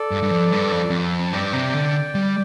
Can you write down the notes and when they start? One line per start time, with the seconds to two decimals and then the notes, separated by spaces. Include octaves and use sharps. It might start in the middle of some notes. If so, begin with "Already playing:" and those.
Already playing: A4 D5
0.11 G2
0.23 G2
0.31 F2
0.52 G2
0.72 F2
0.90 F2
1.23 A5
1.32 G2 D5 G5
1.53 C3
1.74 D3
2.15 G3